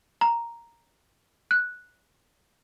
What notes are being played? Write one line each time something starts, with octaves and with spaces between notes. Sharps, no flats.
A#5
F#6